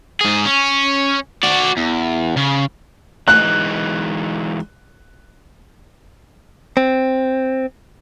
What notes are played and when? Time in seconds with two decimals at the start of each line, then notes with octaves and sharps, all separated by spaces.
0.21 G#2 G#4
0.45 C#4
1.43 F#4 D5
1.77 E2
2.37 C#3
3.28 E3 G#3 D#4 F#6
6.77 C4